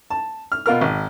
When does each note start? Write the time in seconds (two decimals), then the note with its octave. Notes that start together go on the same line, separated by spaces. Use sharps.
0.10 A5
0.52 F6
0.66 B2 F4 A#4 F6
0.81 G#1